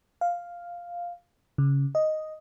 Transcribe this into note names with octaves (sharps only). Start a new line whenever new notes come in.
F5
C#3
D#5